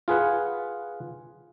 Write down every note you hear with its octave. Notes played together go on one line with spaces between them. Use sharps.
F4 G#4 B4 F#5